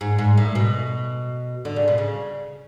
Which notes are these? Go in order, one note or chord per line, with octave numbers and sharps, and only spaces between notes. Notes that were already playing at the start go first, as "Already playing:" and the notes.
G#2
G#2
A2
B2
D3
C#3
B2
C#3